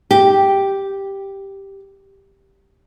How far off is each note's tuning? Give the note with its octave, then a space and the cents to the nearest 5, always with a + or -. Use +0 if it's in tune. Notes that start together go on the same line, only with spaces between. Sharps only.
G4 +0